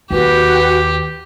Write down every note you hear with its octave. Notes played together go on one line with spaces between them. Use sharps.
D#2 F#4 G4 B4 G5